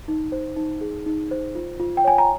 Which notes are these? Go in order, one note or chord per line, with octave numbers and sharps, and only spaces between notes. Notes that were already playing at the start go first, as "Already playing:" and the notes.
D#4
C5
D#4
G#4
D#4
C5
F4
F4
G5
C#5 G#5
A#5